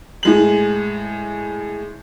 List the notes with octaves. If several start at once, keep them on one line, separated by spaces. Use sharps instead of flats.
A2 G#3 F#7